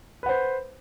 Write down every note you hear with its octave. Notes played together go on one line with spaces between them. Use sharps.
B4 C5 F#5